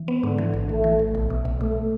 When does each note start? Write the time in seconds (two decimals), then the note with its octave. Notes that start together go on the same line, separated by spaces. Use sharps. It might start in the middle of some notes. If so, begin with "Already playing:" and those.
Already playing: E3
0.08 B3
0.23 G#2 D3
0.38 E3
0.54 A1
0.69 A1 A3
0.84 E3
0.99 A1
1.15 B1
1.30 B2
1.45 B1
1.60 B2 A3